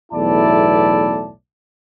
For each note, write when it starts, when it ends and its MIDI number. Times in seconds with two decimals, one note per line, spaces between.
0.13 1.29 35
0.13 1.29 40
0.13 1.29 45
0.13 1.29 64
0.13 1.29 74
0.13 1.29 81